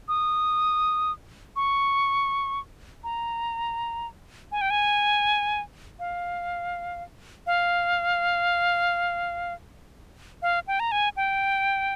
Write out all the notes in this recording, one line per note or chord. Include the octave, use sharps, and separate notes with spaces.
D#6
C#6
A#5
G#5
G5
G#5
F5
F5
F5
G5
A#5
G#5
G5